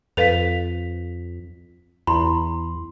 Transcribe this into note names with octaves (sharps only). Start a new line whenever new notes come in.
F2 A4 B4 F5 B6 F7
E2 E4 B5 C6